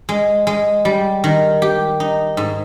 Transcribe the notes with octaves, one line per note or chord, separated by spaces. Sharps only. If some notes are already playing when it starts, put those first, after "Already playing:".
G#3
G#3
G3
D#3
G4
D#4
G#2